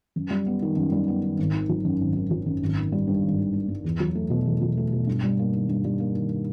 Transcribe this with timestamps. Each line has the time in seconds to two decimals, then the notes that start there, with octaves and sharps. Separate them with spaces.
0.16 F#2
0.30 G3
0.46 B3
0.62 D#3
0.76 F#2
0.92 G3
1.08 B3
1.23 D#3
1.38 G#1
1.53 D#3
1.69 F#3
1.85 F#2
2.00 G#1
2.16 D#3
2.31 F#3
2.46 F#2
2.62 G#1
2.77 D#3
2.92 G3
3.07 G2
3.23 G#1
3.38 D#3
3.53 G3
3.69 G2
3.84 E2
4.00 F#3
4.15 A3
4.30 B2
4.46 E2
4.61 F#3
4.77 A3
4.92 B2
5.07 G2
5.24 G3
5.39 A#3
5.54 D#3
5.69 G2
5.85 G3
6.00 A#3
6.15 D#3